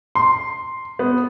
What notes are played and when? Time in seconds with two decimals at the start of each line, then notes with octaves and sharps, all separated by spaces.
0.15 C6
0.99 B3